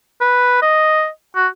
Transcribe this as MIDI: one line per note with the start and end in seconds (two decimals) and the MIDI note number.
0.21 0.62 71
0.62 1.08 75
1.36 1.47 66